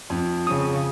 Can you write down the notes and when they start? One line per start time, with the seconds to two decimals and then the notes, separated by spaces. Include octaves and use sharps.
0.10 F2
0.47 C#3 D#6